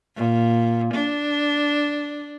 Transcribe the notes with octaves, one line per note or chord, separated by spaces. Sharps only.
A#2
D4